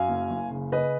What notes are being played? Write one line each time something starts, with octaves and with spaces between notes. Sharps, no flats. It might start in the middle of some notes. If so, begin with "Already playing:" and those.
Already playing: F#2 F5 G#5
F#1
F#1
C#3
C#3 B4 D#5